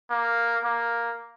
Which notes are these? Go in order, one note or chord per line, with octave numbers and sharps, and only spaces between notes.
A#3
A#3